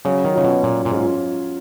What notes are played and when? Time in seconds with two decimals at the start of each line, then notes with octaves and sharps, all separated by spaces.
0.05 C#3 F#3
0.24 D#3
0.34 C#3 C#4 F4
0.44 B2
0.62 A#2 F#3
0.85 A#2
0.92 G#2 C#4 F4